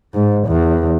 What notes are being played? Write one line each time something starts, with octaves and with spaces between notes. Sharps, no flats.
G#2
E2